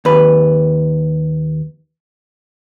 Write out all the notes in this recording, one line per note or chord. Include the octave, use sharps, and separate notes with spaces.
D#2 B4